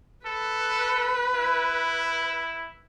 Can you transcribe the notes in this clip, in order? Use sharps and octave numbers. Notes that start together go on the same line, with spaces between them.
A4 B4
E4